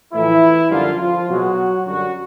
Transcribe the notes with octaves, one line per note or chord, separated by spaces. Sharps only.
A2 E3 F3 A3 E4
F#2 D3 F3 G3 A#3 F4
F3 F4
B2 F#3 G#3 F#4
F#2 D3 F#3 G3 F#4